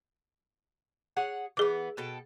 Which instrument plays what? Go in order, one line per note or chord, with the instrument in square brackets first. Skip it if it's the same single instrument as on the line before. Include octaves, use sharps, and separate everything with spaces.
[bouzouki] G#4 C#5 F#5
[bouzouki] E3 B3 [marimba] G#4 D6
[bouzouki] B2 A4 G5